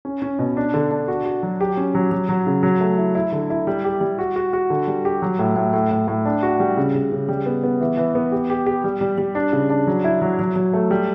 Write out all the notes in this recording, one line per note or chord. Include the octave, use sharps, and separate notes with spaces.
C#4
C#4
B2
D4
D3
D4
F#4
F#4
F#3
G4
C#4
F#3
F#3
F#3
C#3
F#3
A3
E4
E4
D3
E4
G3
G4
G3
F#4
F#4
F#4
D3
G3
G4
F#3
A2
A2
A2
A2
A2
D4
F#4
G3
C#3
C#3
C#3
G3
B3
B3
E3
E3
B3
G4
G4
G4
G3
G3
G3
D4
C#3
D4
F#3
E4
F#3
F#3
F#3
A3
G3